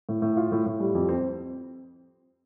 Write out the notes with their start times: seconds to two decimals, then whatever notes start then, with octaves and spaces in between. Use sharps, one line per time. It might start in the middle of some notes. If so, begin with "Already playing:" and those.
0.09 A2
0.22 A2
0.37 F4
0.52 A2
0.66 A2
0.80 G3
0.95 F2
1.09 C4